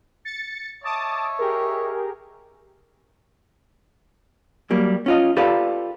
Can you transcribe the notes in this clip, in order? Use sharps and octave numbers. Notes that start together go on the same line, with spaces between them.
A6 C#7
C#5 D#5 E5 A5 D6 D#6
G4 G#4 A#4
F#3 G3 A#3
C#4 F4 D#5
F4 G4 A4 B4 D5 F5